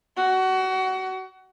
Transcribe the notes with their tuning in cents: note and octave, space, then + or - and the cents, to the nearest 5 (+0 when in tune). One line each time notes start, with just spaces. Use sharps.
F#4 +25